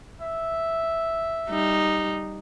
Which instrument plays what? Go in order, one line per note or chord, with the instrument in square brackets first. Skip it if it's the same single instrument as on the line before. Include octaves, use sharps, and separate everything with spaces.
[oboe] E5
[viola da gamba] G3 D#4